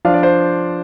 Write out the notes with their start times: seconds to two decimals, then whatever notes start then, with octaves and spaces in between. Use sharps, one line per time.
0.05 F3 D4 F4 F5
0.14 D5
0.23 C5